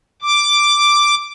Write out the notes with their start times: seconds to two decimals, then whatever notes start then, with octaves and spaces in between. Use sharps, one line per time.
0.22 D6